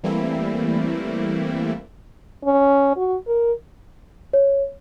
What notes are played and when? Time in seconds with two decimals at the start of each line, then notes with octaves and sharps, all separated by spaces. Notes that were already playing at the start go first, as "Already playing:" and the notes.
0.04 E3 G3 A3 A#3 C4 E4
2.45 C#4
2.97 F#4
3.27 A#4
4.33 C#5